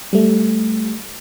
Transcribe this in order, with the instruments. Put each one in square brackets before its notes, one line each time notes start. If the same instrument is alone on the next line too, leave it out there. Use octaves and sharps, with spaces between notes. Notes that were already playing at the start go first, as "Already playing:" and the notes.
[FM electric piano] G3 A3